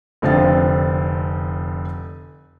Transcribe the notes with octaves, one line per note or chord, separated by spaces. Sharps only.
F1 D3 F3 C4 F5 A6